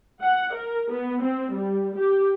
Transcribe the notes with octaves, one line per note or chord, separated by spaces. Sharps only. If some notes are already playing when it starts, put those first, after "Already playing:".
F#5
A#4
B3
C4
G3
G4